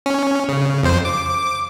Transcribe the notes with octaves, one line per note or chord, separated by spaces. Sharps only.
C#4
C#3
F2 C5
D6